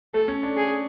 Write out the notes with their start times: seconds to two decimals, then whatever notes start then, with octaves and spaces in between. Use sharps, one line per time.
0.14 A3 A4
0.28 C#4
0.43 D4
0.57 G#4